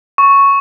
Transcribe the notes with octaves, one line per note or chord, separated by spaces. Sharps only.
C#6